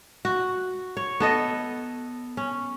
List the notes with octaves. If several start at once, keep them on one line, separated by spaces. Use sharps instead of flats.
F#4
C#5
B3 A4 D#5
C#4